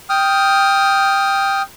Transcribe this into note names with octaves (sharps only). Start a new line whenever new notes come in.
G5 D#6 F6